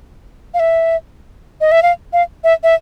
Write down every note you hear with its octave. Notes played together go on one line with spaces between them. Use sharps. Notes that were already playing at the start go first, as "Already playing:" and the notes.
F5
E5
D#5
E5
F5
F5
E5
E5